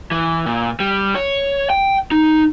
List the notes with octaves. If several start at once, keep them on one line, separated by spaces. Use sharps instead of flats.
E3
A#2
G3
C#5
G5
D#4